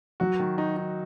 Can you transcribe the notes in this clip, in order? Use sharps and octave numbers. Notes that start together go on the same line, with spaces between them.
F#3 F#4
D#3
D#4
D#4